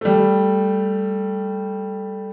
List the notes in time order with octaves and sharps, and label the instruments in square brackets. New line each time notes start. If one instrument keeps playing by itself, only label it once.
[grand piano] G3 A3